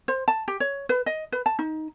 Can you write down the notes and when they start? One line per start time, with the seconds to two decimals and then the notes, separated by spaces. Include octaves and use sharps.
0.08 C5
0.28 A5
0.48 G4
0.60 C#5
0.89 B4
1.06 D#5
1.32 B4
1.46 A5
1.59 D#4